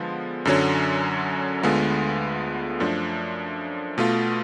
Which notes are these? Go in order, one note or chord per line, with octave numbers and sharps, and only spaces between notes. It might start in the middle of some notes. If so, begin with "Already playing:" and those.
Already playing: D3 F3 G#3 B3 F4
F#2 D3 F#3 C#4
D2 D3 G#3 B3 F4
F#2 F3 A3 D4
B2 A3 F4